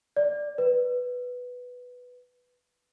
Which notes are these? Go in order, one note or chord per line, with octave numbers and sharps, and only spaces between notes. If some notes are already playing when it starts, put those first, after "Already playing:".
D5
B4